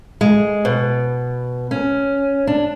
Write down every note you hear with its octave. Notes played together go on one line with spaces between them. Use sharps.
G#3
B2
C#4
D4